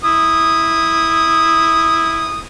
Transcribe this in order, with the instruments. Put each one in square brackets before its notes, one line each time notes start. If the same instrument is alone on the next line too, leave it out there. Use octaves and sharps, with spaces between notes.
[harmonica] E4 D#6